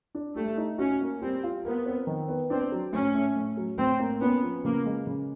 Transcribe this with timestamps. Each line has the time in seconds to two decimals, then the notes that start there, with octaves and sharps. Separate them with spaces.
0.15 D4
0.36 G3 A3
0.58 D#4
0.78 C#4 F#4
1.01 A#3
1.22 G3 C4
1.44 F4
1.65 B3 A#4
1.86 C4
2.07 D#3
2.28 B3
2.50 C4 D4
2.72 F#3
2.93 A2 C#4
3.14 A3
3.36 A2
3.57 F#3
3.78 A2 C4
4.00 A#3
4.21 B3 C#4
4.43 F3
4.64 C#3 A#3
4.85 G#3
5.07 C#3